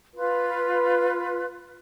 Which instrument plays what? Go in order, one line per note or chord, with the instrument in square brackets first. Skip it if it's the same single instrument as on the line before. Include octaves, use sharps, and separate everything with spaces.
[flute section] F4 B4